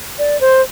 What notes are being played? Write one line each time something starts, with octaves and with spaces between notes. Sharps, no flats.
D5
C5